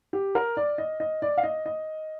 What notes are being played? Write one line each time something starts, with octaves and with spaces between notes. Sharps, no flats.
G4
A#4
D5
D#5
D#5
D5
F5
D#5
D#5